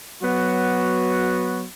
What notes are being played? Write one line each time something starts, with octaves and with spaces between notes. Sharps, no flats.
F#3 B3 F#4